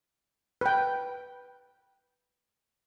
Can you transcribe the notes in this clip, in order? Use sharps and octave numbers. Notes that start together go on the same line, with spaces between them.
B4 G5